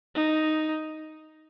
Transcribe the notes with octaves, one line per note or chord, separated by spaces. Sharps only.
D#4